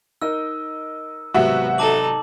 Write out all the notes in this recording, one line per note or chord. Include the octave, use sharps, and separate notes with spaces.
D#4 A#4 D#5 E6
G#1 C3 F#3 B3 F#4 E5
D#4 A4 A5 D6 F#7